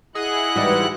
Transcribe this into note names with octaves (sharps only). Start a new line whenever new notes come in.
E4 G#4 D#5 F#5 F#6
G#2 E3 G3 G#3 F#4